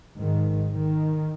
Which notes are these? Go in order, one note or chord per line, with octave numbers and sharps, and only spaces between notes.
G#1 G#2 D#3
D#3